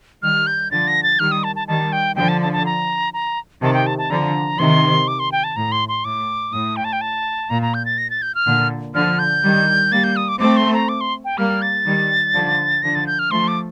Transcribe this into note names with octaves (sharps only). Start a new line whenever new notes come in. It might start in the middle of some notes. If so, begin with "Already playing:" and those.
D#3 G3 F6
G6
D3 F3 A6
A#6
A6
D#3 G3 F6
D#6
A5
A5
D#3 G3 A5
G5
D3 F3 G5
A5
A5
A5
A#5
A#5
C3 D#3 A5
G5
A5
A5
D3 F3 A#5
C3 D#3 C6
D6
C6
G5
A5
A2 A#5
C6
C6
A2 D6
A2 D#6
G5
A5
G5
A5
A#2 A#5
A#5
G6
A6
A#6
A6
G6
F6
A#2 D3
D3 F3 F6
G6
D#3 G3
G3 A#3 A6
G6
D#6
D6
A3 C4 D6
C6
A#5
D6
C6
G5
G3 A#3 F6
A6
D#3 G3
D3 F3
D3 F3 A#6
A6
G6
F6
F3 A3 C6
D6